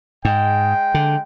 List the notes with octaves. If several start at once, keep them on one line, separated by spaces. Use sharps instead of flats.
G#2 G#3 G5
D3